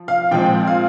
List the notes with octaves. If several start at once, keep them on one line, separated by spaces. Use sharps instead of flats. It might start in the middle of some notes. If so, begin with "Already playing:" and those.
Already playing: F3
F5
A#2 F3 G#3 C4 G5
F5